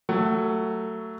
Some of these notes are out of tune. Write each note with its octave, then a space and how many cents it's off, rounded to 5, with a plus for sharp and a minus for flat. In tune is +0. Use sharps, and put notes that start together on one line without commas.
F#3 +20 A3 +25